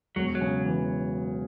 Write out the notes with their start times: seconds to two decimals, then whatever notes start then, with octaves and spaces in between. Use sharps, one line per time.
0.16 E1 F#3
0.35 F#3
0.41 C#3
0.65 E3